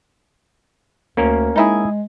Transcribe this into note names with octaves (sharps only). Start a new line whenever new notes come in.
D2 A#3 C#4 A#4
G#3 D#4 E4 G#4